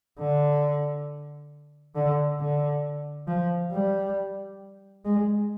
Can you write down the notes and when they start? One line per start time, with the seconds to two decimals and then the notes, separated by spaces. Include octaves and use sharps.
0.19 D3
1.95 D3
2.40 D3
3.27 F3
3.72 G3
5.05 G#3